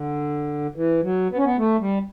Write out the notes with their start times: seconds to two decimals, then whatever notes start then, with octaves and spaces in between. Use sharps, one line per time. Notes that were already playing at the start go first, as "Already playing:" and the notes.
Already playing: D3
0.76 E3
1.03 F#3
1.31 B3
1.37 C#4
1.45 B3
1.58 A3
1.80 G3